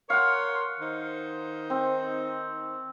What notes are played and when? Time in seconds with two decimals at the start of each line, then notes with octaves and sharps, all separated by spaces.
0.10 A#4 C#5 F5 F#5 C6
0.80 D#3 D#4 C5
1.70 C4